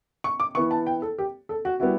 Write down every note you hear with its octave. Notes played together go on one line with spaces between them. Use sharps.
C#6
D6
E3 B3 E4 C#6
A5
G5
A4
G4
A4
F#4
G3 B3 E4 F#4